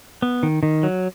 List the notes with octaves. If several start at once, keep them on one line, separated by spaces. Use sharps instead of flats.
B3
D#3
D#3
F#3